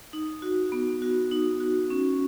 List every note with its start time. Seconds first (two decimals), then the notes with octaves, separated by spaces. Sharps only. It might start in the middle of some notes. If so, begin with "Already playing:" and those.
0.13 D#4
0.42 F#4
0.72 B3
1.02 F#4
1.31 D#4
1.60 F#4
1.90 C#4